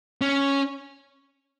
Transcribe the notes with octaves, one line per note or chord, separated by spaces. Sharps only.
C#4